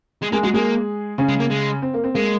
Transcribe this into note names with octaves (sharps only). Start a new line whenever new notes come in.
G#3
G#3 A#3 G#4
F#3 G#3 F#4
G#3 A#3 G#4
C#3 C#4
G#3
A#3
G#3
C4
A#3
C4
G#3 A#3